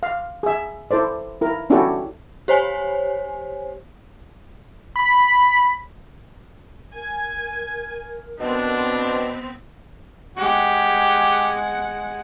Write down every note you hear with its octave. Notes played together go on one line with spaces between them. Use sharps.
F5
G#4 E5
E4 A4 C5 D5
E4 A#4
C#4 D4 E4 F#4 G4 A4
G4 C5 C#5 G#5
B5
A#4 G#5
B2 B3 C4 D4
G#3 G4 F#5